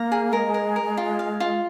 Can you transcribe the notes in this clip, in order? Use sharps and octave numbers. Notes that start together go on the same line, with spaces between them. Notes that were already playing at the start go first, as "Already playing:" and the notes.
Already playing: A#3 A#5
G#4
G#3 A#4
A#4
A#4
F4
F5
F4